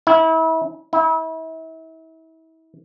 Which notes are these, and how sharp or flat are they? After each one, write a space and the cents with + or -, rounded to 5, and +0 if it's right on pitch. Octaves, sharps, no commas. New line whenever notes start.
E4 -30
E4 -35